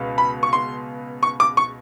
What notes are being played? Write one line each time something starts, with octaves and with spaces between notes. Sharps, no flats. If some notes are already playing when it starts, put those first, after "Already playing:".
Already playing: C#2 B2
B5
C#6
C6
C#6
D6
C#6